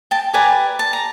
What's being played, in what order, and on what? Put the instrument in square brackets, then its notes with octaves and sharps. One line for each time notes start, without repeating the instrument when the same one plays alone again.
[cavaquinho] G5 A5
G4 B4 D5 G#5 A#5
A5
A#5